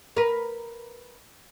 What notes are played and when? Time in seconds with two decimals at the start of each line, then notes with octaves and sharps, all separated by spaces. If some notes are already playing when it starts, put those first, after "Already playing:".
0.16 A#4 B4